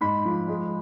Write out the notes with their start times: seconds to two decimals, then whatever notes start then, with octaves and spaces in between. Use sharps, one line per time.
0.01 G#2 B5
0.25 F3
0.48 G#3